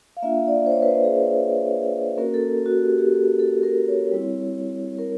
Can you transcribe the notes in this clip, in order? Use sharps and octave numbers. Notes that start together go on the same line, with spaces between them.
F5
A#3 D4 F4 E5
D5
C5
C#5
B4
C5
G#4
A#3 C#4 F#4 A#4
A4
F#4
G4
G4
A4
A4
A#4
C#5
G3 C4 E4
A#4